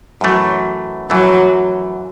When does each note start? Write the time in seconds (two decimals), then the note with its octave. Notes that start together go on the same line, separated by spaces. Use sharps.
0.21 F#2 E3 F#3 A3
1.10 F#2 E3 F#3 A3